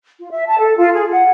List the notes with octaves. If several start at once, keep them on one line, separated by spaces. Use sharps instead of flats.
F4
E5
A5
A4
F4
G#4
F#5